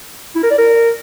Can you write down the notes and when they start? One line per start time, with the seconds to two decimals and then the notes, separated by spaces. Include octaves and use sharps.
0.36 E4
0.43 A#4
0.51 D5
0.58 A#4